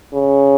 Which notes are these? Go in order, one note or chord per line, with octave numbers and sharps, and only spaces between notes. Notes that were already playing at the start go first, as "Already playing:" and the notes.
C#3